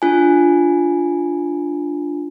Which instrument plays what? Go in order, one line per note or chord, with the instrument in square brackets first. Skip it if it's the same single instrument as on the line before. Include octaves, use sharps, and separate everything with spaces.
[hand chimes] D4 F4 G#5